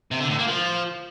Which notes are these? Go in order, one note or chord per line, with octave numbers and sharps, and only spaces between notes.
C3
D3
A2
A#3
F3